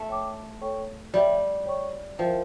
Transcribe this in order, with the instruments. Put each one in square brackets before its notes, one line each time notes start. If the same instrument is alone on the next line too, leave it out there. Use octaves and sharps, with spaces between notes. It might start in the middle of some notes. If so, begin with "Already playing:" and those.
Already playing: [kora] A3
[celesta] C#5 G5 D6
A4 C#5 G5 C#6
[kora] G3 [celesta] C#5 E5 G5
[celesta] C#5 G5 C#6
[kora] F3 [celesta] E4 A#4 E5 G5